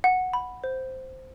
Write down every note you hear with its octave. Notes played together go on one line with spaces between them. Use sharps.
F#5
B5
C5